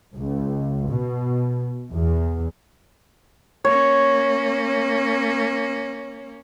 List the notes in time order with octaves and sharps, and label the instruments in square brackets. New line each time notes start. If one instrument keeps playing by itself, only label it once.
[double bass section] C#2
B2
E2
[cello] A#3 C#4 [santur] C#5